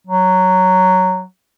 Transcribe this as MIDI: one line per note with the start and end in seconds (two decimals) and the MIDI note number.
0.07 1.23 54